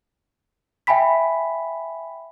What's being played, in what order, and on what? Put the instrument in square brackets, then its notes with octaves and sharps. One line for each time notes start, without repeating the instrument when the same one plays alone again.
[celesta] E5 G5 G#5 B5 B6